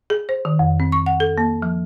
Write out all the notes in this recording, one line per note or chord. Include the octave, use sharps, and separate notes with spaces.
G#4
C5
D#3
F2
C4
C#6
F#5
A4
A#3
F3